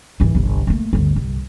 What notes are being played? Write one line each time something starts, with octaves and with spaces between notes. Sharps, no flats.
G#1 E3
G1 C2
A3 A#3
G1 D2
C2